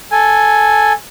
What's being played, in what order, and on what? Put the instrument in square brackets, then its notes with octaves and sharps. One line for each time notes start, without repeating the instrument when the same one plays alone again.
[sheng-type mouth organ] A4 G#5